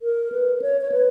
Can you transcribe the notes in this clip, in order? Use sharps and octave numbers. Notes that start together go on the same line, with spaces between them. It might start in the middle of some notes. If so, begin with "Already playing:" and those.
A#4
B4
B4
C#5
C#5
B4